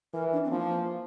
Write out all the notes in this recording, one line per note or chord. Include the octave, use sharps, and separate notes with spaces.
E3 A#4
D4
C4
F3 A#3